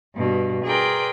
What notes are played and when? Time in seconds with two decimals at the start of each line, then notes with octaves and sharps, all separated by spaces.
0.15 G2 B2
0.65 G#4 A#4 B4 D5 G5 C6